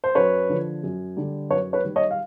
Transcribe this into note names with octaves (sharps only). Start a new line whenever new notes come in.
C5
F#2 B4 C#5
D3 F3
F#2
D3 G3
F#2 B4 C#5
B4 C#5
D#3 G3
C#5 D#5
F5